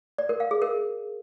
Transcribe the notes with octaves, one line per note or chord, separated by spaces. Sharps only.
D5
A#4
F5
G#4
A#4